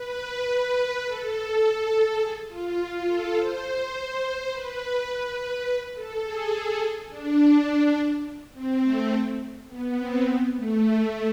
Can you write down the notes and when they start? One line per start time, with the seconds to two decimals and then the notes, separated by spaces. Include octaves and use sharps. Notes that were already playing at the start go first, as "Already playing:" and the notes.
Already playing: B4
1.05 A4
2.20 G#4
2.48 F4
2.77 F4
3.06 A4
3.35 C5
4.50 B4
5.08 B4
5.65 B4
5.94 A4
6.23 G#4
7.09 D4
8.53 C4
8.82 A3
9.69 B3
9.97 C4
10.26 B3
10.55 A3